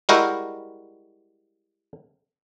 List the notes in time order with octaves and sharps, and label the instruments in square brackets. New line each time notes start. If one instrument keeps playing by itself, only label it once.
[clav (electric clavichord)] G3 G#3 E4 F#4 A#4 G5